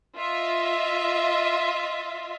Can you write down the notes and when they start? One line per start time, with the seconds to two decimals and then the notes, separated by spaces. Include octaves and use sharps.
0.17 F4 D#5 E5